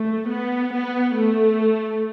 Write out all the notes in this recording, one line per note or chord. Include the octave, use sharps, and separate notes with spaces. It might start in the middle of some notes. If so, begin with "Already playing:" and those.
Already playing: A3
B3
B3
A3